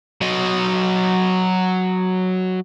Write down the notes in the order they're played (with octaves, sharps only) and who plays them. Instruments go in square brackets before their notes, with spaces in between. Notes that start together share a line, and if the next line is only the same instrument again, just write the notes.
[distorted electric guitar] F#3 D#5